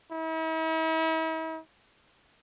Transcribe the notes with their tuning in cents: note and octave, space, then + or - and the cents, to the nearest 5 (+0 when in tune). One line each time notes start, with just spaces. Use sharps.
E4 -45